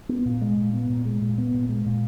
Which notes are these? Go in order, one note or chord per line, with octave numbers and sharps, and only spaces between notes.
B3
A#2
G#3
A#2
B3
A#2
G#3
A#2
B3
A#2
G#3
A#2